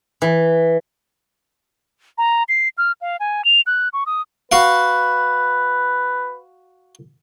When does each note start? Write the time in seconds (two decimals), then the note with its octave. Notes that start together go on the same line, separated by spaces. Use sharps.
0.22 E3
2.18 A#5
2.49 C7
2.78 F6
3.01 F5
3.20 G#5
3.45 F7
3.67 F#6
3.93 C#6
4.06 D#6
4.52 F#4 B4 F5 F#5